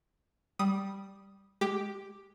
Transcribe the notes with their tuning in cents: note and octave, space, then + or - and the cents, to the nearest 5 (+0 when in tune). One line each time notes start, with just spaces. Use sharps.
G3 +0 D#6 +0
G#3 +0 G4 +0